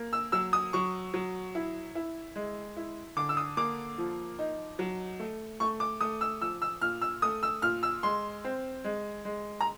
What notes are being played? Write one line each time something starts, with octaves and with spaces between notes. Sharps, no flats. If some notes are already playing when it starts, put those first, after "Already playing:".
Already playing: A#3
E6
F#3 E6
D#6
F#3 C#6
F#3
E4
E4
G#3
E4
D3 D6
E6
D#6
A#3 D6
F3
D#4
F#3
A3
A3 C#6
D6
A3 D#6
E6
F3 E6
E6
A#2 F6
E6
A3 D#6
E6
A#2 F6
E6
G#3 C6
C4
G#3
G#3
A#5